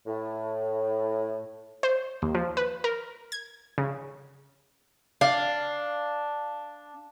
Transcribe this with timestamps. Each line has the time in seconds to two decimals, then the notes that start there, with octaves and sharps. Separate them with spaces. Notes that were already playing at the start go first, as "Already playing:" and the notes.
0.06 A2
1.83 C5
2.22 D#2
2.35 F3
2.57 B4
2.84 A#4
3.32 G#6
3.78 C#3
5.21 D4 F5